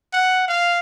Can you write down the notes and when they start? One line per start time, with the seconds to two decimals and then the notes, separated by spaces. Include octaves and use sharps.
0.13 F#5
0.48 F5